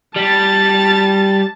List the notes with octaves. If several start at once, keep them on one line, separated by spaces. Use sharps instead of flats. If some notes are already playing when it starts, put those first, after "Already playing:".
G3 A5 A6